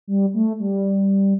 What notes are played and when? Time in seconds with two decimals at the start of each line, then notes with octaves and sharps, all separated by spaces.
0.07 G3
0.34 A3
0.60 G3